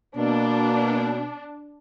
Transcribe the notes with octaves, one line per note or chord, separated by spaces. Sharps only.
B2 A#3 D4